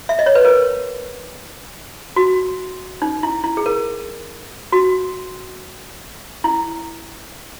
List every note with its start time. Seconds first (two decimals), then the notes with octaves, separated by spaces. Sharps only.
0.09 E5
0.19 D#5
0.26 C#5
0.35 B4
0.45 A#4
2.16 F#4
3.02 D#4
3.23 E4
3.44 E4
3.57 G#4
3.66 A#4
4.72 F#4
6.44 E4